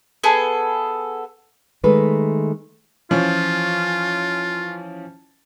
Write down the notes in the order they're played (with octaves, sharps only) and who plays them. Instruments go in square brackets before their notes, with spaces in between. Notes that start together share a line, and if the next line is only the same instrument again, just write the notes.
[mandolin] B3 G#4 A4
[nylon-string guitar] D#3 G#3 A3 B4
[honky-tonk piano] E3 F3 C#4 [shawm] F4